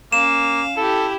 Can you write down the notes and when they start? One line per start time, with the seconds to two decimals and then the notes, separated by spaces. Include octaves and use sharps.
0.12 A#3 C#4 F5 E7
0.77 E4 G4 A4